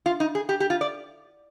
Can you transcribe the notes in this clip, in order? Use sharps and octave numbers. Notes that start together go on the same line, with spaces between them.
F4
D#4
G#4
G4
G4
F4
D5